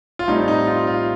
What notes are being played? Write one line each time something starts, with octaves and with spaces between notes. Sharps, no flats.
F4
A2 G3 C4 D#4
D#4
F4
F4